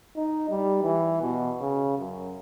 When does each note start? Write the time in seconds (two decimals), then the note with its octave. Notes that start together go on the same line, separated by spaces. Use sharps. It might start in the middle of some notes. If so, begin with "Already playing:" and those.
0.16 D#4
0.50 G3
0.82 E3
1.22 B2
1.60 C#3
1.98 F#2